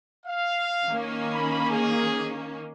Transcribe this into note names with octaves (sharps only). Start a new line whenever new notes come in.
F5
D#3 A#3 C#4
B5
G#4